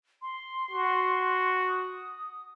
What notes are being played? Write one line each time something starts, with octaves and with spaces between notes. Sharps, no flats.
C6
F#4
D#6